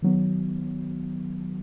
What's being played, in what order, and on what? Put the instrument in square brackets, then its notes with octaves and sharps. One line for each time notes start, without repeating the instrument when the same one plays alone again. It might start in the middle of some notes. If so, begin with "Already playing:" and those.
[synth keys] D#3 F#3 B3